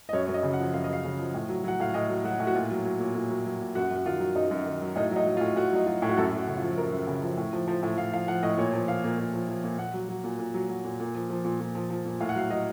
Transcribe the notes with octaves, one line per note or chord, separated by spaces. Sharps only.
D#5
F#2 C#5
F#2 C#5
D#5
C#3
F#5
F3
F#2 F5
D#5
F#2 F5
C#3
F3
A2
F#3
F#3 F#5
A2 F5
A2 D#5
F#3
F#3 F#4
A2
F#4
A#2 F4
F#3
F#3
A#2
A#2
F#3
F#3
A#2
F#2 F#4
F#2 F#4
D#3 F4
F#3
F#2 D#4
F#2
D#3
F#3
A2 D#4
F#3 D#4
F#3
F4
A2
A2 F#4
F#3 D#4
F#3 F4
A2
F#4
F#2 A4
F#2
F#4
C#3
F4
F3
F#2 A#4
F#2
C#3
F3
A2
F3
F3
A2
A2 F5
F3 F5
F3 F#5
A2 D#5
A#2 C#5
F3
F3 F5
A#2
A#2
F3
F3
A#2
A#2 F#5
F#3
F#3
A#2
A#2
F#3
F#3
A#2
A#2
F3
F3
A#2
A#2
F3
F3
A#2
A2 F5
F#5
F#3 F5
F#3 D#5